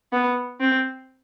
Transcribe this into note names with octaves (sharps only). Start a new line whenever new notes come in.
B3
C4